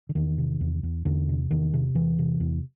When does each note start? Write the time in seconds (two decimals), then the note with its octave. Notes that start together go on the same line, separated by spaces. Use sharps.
0.09 D3
0.15 E2 D#3
0.38 C3
0.61 E2
0.83 E2
1.05 E2 D3
1.28 C3
1.51 E2 D#3
1.73 C3
1.95 E2 E3
2.19 C3
2.40 E2